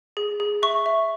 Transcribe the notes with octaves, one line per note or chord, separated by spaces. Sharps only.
G#4
G#4
E5 C#6
E5